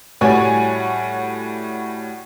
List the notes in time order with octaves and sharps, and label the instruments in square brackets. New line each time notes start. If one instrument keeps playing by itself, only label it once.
[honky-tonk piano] A2 G3 F#4 C#5 G#5 A6